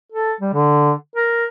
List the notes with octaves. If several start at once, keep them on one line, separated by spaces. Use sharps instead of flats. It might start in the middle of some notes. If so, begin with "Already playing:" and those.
A4
G3
D3
A#4